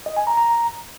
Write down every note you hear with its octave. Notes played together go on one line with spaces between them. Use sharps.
D#5
G#5
A#5
A#5